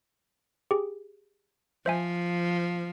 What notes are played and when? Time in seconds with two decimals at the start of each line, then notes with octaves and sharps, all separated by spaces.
0.71 G4 G#4
1.86 F3 C5 E5 G#5